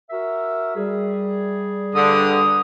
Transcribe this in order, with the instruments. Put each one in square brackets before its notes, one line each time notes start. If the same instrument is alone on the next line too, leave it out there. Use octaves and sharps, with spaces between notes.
[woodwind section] F#4 A#4 E5
G3 G#4
[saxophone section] G2 D3 [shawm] D#6